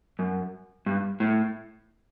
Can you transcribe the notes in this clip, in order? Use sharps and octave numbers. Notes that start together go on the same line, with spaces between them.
F#2
G2
A2